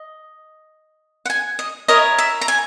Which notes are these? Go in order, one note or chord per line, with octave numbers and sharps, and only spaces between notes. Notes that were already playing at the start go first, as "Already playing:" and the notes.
Already playing: D#5
F#5
G#5
D#5
E4 A#4 C#5 D#5
E5
A#5
G#5